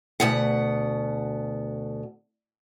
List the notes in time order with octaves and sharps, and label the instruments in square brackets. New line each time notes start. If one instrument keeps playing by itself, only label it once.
[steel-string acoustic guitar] D2 B2 F#5